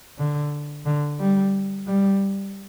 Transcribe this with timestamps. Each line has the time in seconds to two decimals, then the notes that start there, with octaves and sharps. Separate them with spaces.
0.18 D3
0.85 D3
1.20 G3
1.87 G3